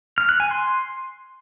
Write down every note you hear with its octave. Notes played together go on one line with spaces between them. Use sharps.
F6
F#6
G#5
C6